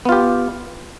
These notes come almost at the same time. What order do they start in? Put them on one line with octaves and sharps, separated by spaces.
B3 F4 G4